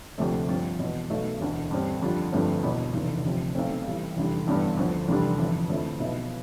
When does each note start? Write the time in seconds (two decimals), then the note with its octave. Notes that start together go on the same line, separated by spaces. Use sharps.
0.18 D2 C3 F3 A3
0.48 G2 F3 C4 F4
0.79 E2 B2 B3
1.10 B1 B2 A3
1.40 E1 D2 D3
1.71 G2 D3 G3 C4
2.02 F2 D3 G3 D4 F4
2.32 G1 G2 F3 A3 C4
2.63 E1 E2 B2 B3
2.94 F1 E2 D3
3.24 D2 C3 F3
3.55 B1 B2 A3 C4
3.86 A1 A2 G3
4.16 F1 E2 D3 G3
4.47 A1 G2 D3 G3 B3
4.77 D2 D3 F3
5.08 F1 E2 D3 G3 D4
5.38 G1 F2 E3
5.69 F2 D3 F3 A3 E4
5.99 B1 B2 B3 E4